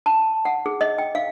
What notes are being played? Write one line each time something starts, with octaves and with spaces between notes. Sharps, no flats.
A5
F#5
G#4
D#5
G5
F5